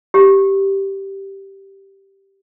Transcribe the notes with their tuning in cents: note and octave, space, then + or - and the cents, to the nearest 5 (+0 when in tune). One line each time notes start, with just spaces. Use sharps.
G4 -5